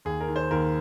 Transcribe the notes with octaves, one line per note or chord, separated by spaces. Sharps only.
D#2 G#4
A#4
D#3
C5
D#2 A#4